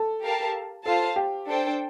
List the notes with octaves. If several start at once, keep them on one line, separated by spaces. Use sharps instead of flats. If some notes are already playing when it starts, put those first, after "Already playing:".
Already playing: A4
G4 A#4 F5 A5
F4 A4 C5 F5 A5
G4
D4 A4 C5 G5